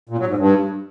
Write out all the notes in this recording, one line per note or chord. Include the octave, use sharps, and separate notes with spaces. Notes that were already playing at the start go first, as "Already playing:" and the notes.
A#2
F#3
G#2
G2